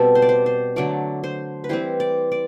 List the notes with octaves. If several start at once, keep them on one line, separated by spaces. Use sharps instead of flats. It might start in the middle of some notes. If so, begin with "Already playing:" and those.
Already playing: B2 G3 C4 A4
C5
D5
C5
C5
D3 F#3 A3 D5
C5
B4
E3 G3 C4 C5
D5
D5